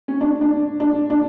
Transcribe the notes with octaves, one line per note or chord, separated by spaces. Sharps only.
C#4
D4
D4
D4
D4